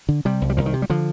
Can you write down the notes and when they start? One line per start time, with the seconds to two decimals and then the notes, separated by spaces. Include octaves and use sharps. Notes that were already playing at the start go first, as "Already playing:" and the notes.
0.09 D3
0.25 C3 G3
0.42 C2
0.50 G3
0.57 C2 F3
0.66 D#3
0.73 C3
0.82 G3
0.90 D3 F3